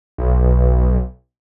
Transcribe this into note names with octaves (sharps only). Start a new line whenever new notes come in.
B1